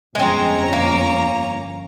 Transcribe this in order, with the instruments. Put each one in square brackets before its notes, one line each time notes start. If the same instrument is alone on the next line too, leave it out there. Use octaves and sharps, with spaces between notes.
[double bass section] G1 F2 [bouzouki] G#3 C4 [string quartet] C#4 A#5
[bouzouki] A#3